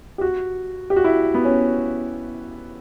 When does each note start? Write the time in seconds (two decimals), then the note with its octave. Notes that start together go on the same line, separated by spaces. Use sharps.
0.18 G4
0.21 F#4
0.90 G4
0.96 F#4
1.04 E4
1.34 B3
1.45 C#4